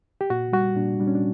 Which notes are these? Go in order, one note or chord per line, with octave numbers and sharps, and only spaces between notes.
G4
A#2 F#4
G3 F#4
A#2 D4
G3 D4
C#4
D4